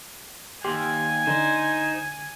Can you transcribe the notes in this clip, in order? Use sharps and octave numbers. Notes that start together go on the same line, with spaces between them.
D#2 G4 G#5 C6
D3 D#4 C5